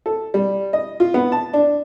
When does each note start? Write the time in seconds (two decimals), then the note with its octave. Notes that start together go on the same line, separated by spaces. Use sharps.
0.06 A4
0.34 G3
0.73 D#5
1.00 F4
1.14 B3
1.32 A5
1.53 D4